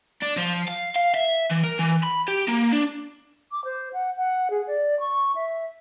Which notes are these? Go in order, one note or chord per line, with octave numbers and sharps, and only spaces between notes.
D4
F3
F5
F5
E5
E3
A#4
E3
B5
G4
A#3
D4
D6
C5
F#5
F#5
G#4
D5
C#6
E5